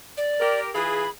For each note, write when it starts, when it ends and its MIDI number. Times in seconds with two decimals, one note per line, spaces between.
0.17 0.60 74
0.40 0.70 67
0.40 0.70 70
0.75 1.07 52
0.75 1.07 65
0.75 1.07 68
0.75 1.10 83